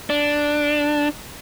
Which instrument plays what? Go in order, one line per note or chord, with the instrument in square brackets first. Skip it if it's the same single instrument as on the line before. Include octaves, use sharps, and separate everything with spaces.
[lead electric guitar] D4